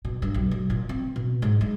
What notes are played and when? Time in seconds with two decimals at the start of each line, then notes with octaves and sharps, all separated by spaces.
0.05 B2
0.22 G2
0.34 B1
0.51 B1
0.70 A#2
0.89 C4
1.16 B2
1.42 G#2
1.61 G#3